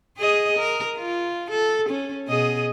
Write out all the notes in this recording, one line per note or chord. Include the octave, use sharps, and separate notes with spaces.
G#4 D#5
A#4
F4
A4
C#4
B2 G#4 D#5